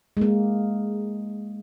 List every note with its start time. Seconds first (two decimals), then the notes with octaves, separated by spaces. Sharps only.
0.17 G#3
0.21 A#3